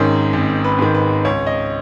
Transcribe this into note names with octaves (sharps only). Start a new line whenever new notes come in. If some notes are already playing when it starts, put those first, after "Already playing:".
Already playing: G#1 G#2 D#3 C#4 D#4
G#1
B4
G#2 D#3
B4
C#2 C#5
D#5